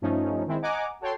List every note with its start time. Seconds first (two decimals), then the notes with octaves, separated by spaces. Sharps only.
0.01 G2 F3 A3 C#4 D#4
0.46 D#3 G#3 C4 E4
0.62 D#5 F#5 G#5 A#5 D6
1.00 F#4 A4 C#5 G5 A5 C6